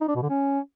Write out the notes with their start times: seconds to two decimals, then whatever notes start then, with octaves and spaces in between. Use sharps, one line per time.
0.01 D#4
0.08 D4
0.15 B2
0.23 D3
0.30 C#4